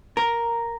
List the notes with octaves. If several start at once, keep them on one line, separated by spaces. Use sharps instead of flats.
A#4